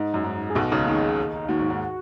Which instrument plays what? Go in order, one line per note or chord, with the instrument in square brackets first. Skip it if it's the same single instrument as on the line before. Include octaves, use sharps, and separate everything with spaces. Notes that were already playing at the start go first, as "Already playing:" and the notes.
Already playing: [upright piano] G#2 [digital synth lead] D#4
[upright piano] F#2
G#2
[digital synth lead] G#4
[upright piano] B1 B2 [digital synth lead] F#4
[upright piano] C#2 C#3 [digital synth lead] D#4
[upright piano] D#2 D#3
[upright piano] D#2 D#3 [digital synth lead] F#4
[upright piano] G#2
G#2